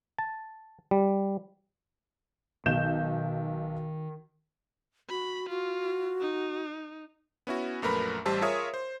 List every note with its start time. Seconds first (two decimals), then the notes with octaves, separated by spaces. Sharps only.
0.19 A5
0.91 G3
2.66 B1 D#3 G6 E7
5.09 F#4 B5
5.49 F4 F#4
6.21 D#4
7.47 B3 C#4 E4 F#4
7.82 A#1 F#2 A3 A#4 B4 B5
8.26 A1 G3 G4 C5 A5 E6
8.41 F4 G#4 A#4 C#5 E5 D#6
8.74 C5